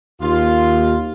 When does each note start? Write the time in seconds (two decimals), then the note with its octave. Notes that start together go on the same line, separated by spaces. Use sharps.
0.22 D#2 F4